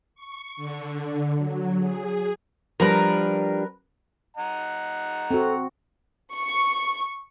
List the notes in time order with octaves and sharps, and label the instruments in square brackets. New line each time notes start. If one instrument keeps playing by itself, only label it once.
[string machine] C#6
D3
F#3
G#4
[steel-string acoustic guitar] F3 G3 D4 [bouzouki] A#4 B4
[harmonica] D#5 F#5 A#5
[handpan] C4 F#4 [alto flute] A4
[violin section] C#6